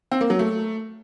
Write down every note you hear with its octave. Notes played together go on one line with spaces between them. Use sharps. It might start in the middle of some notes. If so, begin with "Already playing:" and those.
C4
A#3
F#3
A3